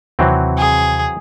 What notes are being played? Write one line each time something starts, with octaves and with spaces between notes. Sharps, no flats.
D#2 C3 E3 F#3 C4
G#4